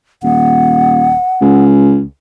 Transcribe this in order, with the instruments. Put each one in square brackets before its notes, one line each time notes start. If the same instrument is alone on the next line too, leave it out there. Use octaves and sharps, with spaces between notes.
[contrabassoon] D#1 [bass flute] F#5
[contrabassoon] C#2